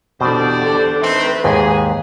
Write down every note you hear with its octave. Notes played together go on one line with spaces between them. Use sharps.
E2 B2 D3 G4 C5 D5
A4
D#3 A3 C4 B4
D#2 G#2 G#4